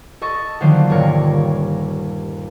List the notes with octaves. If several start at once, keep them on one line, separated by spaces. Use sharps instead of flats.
A4 D#5 C#6 A6
D3 D#3 F3 F#3 A#3 C5
D#1 G2 A#4 C#5